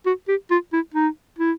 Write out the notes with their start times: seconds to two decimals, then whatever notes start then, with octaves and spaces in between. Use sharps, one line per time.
0.06 F#4
0.28 G4
0.51 F4
0.73 E4
0.94 D#4
1.39 E4